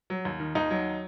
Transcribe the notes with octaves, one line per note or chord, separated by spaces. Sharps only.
F#3
D#2
D#3
D#2 D#4
F#3